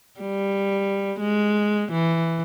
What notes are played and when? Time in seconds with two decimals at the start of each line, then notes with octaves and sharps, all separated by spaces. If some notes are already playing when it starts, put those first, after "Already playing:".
0.20 G3
1.20 G#3
1.92 E3